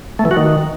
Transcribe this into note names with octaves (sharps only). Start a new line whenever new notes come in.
A3
E3
F#4
D#3